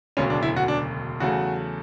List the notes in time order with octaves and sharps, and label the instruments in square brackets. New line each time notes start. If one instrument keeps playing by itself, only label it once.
[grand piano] E1 D2 C#3 F#3 C#4
D4
E4
F#4
D4
E2 C#3 F#3 A3 F#4